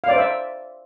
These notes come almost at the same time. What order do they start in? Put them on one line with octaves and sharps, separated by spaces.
F5 D5 C5 E5